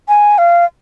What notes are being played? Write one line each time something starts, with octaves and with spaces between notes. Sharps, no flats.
G#5
F5